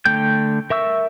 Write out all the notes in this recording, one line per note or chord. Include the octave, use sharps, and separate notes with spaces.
D3 A3 G5 G6
A#4 E5 C#6 E6